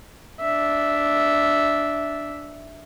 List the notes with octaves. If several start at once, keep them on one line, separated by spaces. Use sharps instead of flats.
D4 E5